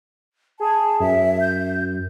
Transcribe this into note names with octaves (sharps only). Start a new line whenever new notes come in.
G#4 A5
F#2 E5
G6